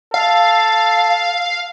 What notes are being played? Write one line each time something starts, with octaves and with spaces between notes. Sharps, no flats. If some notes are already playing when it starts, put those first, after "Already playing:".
A4 F5